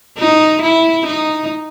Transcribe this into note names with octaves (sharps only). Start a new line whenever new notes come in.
D#4
E4
D#4